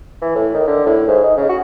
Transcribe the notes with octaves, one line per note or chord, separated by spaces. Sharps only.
E3
A2
D#3
D3
A2
G#2
D#4
C#3
F#4